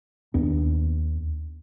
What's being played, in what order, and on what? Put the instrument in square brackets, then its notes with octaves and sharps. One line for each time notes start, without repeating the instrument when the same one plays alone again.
[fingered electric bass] D#2 B3 D4